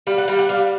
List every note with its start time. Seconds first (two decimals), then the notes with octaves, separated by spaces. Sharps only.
0.07 G3 F5
0.18 F#5
0.28 G3 F5
0.39 F#5
0.49 G3 F5